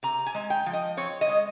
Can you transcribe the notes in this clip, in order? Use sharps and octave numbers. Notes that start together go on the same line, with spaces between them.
C3 A#5
G#5
G#3
G5
F3
D#5
C4 C#5
D#5
G#3